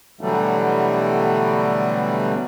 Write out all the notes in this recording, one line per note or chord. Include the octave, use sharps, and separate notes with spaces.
B2 D3 E3 F#3 G3 A3